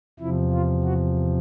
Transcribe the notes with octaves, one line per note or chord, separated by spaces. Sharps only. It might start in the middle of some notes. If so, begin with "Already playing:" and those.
E2 C3 F3 E4
F4
F#4